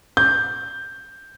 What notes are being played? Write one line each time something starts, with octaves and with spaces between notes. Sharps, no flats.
G6